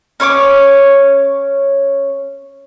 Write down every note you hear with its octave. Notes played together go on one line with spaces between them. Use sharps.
C#4 C#5 C#6 D6